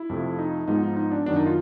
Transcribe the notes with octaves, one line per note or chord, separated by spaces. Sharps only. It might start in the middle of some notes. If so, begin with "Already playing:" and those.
Already playing: E4
F2 C3 F3 A3
D#4
G#2 F3 G#3 B3 D#4
D#4
D#4
D4
F#2 D#3 F#3 B3 D4
D#4
F4